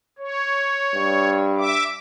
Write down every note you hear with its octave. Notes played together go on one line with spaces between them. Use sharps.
C#5
G2
E5 D6